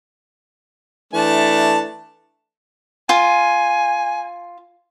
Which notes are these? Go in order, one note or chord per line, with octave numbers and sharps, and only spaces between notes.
E3 A3 D4 A5
F4 G#5